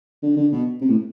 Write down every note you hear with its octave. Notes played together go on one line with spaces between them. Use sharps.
D3
D3
B2
C3
A2